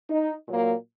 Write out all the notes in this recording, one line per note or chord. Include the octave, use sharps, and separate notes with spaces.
D#4
A#2 F#3 A#3